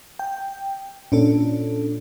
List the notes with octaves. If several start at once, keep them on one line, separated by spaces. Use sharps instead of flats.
G5
A#2 C#4 D4 A4